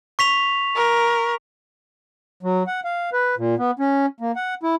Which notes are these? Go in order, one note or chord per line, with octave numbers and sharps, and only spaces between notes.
C#6 B6 F7
A#4
F#3
F#5
F5
B4
A#2
B3
C#4
A#3
F#5
E4